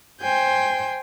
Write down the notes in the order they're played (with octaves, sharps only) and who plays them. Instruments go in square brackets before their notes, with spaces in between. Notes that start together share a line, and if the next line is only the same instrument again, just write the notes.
[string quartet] C5 G5 G#5 G6